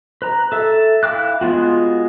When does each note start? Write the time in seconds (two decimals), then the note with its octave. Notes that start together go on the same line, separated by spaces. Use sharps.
0.22 B4 A#5
0.52 A4 E5 E6
1.03 E4 F5 G5 D6 F#6
1.41 G#3 B3 F4 F#4